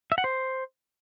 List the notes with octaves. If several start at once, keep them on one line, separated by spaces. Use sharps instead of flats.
E5
F#5
C5